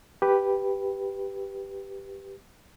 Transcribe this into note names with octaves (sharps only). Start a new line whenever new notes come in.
G4 B4